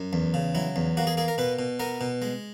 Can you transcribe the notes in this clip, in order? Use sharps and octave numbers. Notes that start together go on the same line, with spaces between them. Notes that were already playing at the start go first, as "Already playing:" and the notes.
Already playing: F#2
E2
C#3
F#3 E4
E2
A#3 F#4
G#4
A#3 G#4
A#4
B2 B4
B2
B3 A#4
B2
G#3